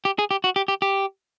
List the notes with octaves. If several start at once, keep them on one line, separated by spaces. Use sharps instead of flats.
G4
G#4
G4
F#4
G4
G4
G4